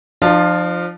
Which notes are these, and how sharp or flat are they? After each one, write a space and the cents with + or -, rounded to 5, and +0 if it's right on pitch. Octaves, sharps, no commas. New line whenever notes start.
F3 +0 D4 +45 F4 +0